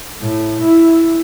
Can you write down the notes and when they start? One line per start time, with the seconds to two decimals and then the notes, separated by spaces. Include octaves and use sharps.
0.20 A2
0.61 E4